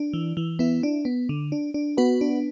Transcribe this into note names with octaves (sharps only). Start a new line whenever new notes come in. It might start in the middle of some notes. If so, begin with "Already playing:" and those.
Already playing: D4
E3
E3
B3 E4
D4
B3
D3
D4
D4
B3 F#4 B4
D4